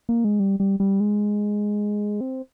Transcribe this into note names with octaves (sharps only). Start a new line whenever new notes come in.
A#3
G#3
G3
G3
G3
G#3
C4